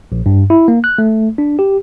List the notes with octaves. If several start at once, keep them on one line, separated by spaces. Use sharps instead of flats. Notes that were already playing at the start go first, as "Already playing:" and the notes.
A#1
G2
E4
A#3
F#6
A3
D4
G4